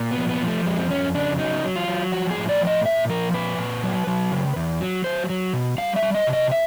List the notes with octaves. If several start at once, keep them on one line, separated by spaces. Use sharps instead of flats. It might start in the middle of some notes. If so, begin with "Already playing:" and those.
Already playing: A#2
B3
F3
B3
F3
A3
F2 G#3
C4
F2 C#4
C#3 D4
F#3 D#4
F#3
F4
F#3
F3 F#4
G#4
A2
D5
F3
D#5
A#2 E5
F3 A#4
A#2 B4
A#2
F#3
F#3
C#3
E2
F#3
F#3 C5
F#3
B2
G3 F5
E5
G3
D#5
C3
D#5
E5